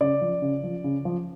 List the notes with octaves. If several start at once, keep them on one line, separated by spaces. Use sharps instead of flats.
C#3 D5
F3
C#3
F3
C#3
F3